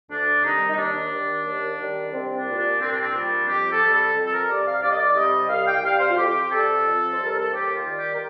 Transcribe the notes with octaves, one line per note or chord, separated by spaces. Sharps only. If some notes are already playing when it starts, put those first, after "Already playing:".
D2 D4
C3 D#3 G3 D#4
D#4
D#2 D4
D#3 G3
D#2
D#3 G3
C2 C4
D4
A#2 G3
D4
C2 C4
D4
C4
A#2 G3 D4
F2 G4
A4
C3 G3
A4
F2
A4
A#4
C3 G3 D5
F5
C2 D5
D#5
D5
C3 G3 D#5
C2 F5
G5
C3 G3 F5
C5
F4
F2 G4
C3 G3 A4
F2
C5
C3 G3
A#4
A4
D#2 G4
F4
D#3 G3
G4
A#4